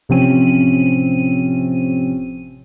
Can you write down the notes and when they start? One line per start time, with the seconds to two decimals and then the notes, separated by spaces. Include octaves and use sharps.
0.09 A1 C3 F3 C4 C#4 D#7